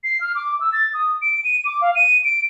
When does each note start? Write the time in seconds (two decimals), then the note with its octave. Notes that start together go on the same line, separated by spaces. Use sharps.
0.04 C7
0.21 F6
0.35 D6
0.60 E6
0.73 A6
0.94 D#6
1.22 D7
1.44 D#7
1.65 D6
1.81 F5
1.95 D#7
2.24 D7